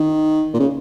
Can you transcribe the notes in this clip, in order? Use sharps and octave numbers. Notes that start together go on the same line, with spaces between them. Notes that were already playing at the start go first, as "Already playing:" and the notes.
Already playing: D#3
A#2
C#3